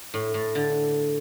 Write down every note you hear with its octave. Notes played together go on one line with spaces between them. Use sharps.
A2
A2
D3